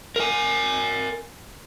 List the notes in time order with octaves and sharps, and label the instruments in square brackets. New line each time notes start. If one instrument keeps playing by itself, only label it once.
[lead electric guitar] A#4 G#5